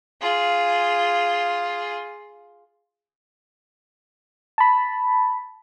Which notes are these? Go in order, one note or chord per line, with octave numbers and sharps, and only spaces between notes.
F4 G#4
A5 B5